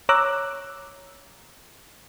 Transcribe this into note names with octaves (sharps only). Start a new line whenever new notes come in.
C#5 A#5 D6 E6 F#6